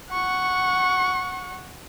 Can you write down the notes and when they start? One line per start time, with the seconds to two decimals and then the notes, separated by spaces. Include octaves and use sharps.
0.12 F#5 C#6